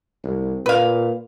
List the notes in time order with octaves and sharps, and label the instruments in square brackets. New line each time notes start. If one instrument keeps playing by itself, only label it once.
[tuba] C2
[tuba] A#2 [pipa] B4 F5